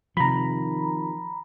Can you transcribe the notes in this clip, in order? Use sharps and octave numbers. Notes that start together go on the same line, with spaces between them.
C3 D#3 F3 A#5 B5